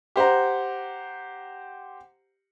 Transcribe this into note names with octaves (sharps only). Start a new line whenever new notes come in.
G4 C5 F#5 A#5